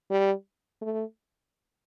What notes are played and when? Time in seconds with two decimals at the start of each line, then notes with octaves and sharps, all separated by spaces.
0.11 G3
0.82 A3